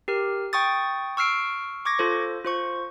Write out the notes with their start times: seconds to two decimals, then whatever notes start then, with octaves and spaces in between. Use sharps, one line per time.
0.08 G4 A#4 F6
0.53 G5 C#6 D#6 A6
1.17 C#6 E6 F6 C7 D7
1.85 C#6 D6 G#6 A#6
1.99 F4 A4 C5
2.45 F4 C5 C#6